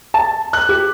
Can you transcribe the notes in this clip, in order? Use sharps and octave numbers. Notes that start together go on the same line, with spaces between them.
A5
F#6
G4